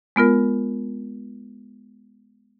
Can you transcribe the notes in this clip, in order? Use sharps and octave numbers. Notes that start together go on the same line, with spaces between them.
G#3 B3 F4 A#4